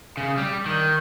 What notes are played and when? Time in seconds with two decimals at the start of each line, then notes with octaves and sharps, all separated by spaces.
0.17 C#3
0.37 G3
0.66 D#3